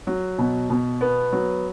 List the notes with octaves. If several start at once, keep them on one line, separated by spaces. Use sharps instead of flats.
F#3
B2
B2
B3
F#3